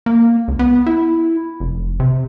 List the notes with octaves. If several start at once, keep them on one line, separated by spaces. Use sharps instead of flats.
A#3
C#2
B3
E4
F1
C3